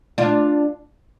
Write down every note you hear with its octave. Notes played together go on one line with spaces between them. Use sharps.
D4 F4